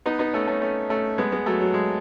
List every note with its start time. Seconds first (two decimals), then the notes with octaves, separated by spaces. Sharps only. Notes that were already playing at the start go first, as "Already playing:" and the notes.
0.06 B3 D#4
0.19 B3 D#4
0.33 A3 C#4
0.47 A3 C#4
0.61 A3 C#4
0.89 A3 C#4
1.18 G#3 B3
1.32 G#3 B3
1.46 F#3 A3
1.61 F#3
1.74 G#3